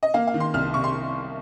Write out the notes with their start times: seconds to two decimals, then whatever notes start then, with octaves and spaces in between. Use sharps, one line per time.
0.03 D#5
0.14 A#3 F5
0.27 F5
0.34 D#3
0.40 C6
0.54 C2 F6
0.74 C3 C#6
0.84 C6